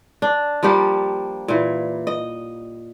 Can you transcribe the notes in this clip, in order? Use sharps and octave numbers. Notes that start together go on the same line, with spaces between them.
D4
F3 G3 A#3 G4
A#2 E3
D#5